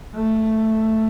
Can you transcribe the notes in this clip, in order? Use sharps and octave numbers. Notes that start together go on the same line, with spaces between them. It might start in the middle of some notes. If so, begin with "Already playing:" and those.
A3